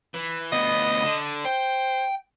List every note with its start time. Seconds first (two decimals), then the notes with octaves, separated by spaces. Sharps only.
0.14 E3
0.52 D2 B3 D#5
1.04 D3
1.45 C5 G5